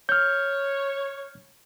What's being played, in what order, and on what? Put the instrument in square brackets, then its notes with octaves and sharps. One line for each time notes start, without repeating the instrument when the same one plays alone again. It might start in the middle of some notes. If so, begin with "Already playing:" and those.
[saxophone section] C#5 [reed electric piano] F6 G6